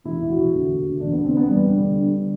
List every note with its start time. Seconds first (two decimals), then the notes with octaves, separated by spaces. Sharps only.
0.04 E1 E4
0.21 E1
0.29 F#4
0.37 E1
0.52 D2
0.69 D2
0.85 D2
1.00 E1 D4
1.12 D2 B3
1.25 C4
1.32 D3
1.37 B3
1.48 E1 G3
1.65 D3
1.80 D2
1.96 D3
2.12 D3